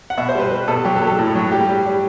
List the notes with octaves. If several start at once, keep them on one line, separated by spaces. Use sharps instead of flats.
F#5
B2 E5
C5
G3 B4
G3 B4
B2 A4
F#3 G4
A4
F#3
A4
A2
F#3
G3 G4
G3
G3